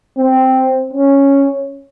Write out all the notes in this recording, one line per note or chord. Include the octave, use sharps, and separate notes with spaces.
C4
C#4